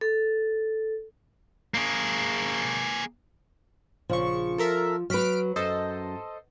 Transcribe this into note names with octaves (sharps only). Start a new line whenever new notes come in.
A4
A#3 G#4
A#1 C#3 F3 C#6
A4 A#4 E5
F#3 B4 F6 B6 D7
F#2 A4 C5 D#5